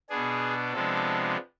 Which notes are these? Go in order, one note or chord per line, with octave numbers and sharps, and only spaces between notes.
B2 B3 D4 G#4
C3 F3 G#3 B3 D4 A4